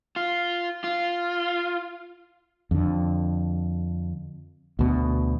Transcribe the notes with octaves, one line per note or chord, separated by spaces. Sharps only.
F4
F4
F2 D3
D2 B2